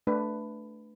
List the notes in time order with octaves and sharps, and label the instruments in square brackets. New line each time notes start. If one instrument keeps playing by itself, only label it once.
[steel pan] A3 D4 B4